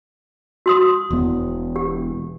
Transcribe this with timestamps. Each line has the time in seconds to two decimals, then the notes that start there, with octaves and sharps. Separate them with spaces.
0.66 F#4 C6 D#6
1.10 E1 E2 B3
1.76 G4